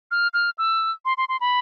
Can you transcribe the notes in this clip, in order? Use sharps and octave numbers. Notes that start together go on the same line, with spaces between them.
F6
F6
E6
C6
C6
C6
B5